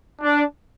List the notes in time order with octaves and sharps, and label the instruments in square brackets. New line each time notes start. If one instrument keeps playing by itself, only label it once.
[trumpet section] D4